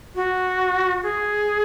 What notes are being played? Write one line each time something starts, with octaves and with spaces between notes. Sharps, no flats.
F#4
G#4